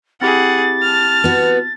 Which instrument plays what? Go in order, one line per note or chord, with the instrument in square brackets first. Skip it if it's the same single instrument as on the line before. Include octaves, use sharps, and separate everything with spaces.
[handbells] C4 E4 G4 [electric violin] G#4 F#5 [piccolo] A6
[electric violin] A5 F6
[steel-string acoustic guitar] B3 F#4